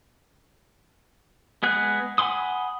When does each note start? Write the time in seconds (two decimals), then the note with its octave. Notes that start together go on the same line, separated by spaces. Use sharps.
1.63 G#3 B3 G#4 F#6
2.18 F#5 G#5 B5 C6 D#6